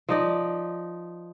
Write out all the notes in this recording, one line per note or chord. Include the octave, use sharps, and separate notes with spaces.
F3 D#4 D5